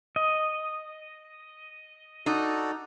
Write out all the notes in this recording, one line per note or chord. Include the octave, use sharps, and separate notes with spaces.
D#5
D#4 F#4 A4 D5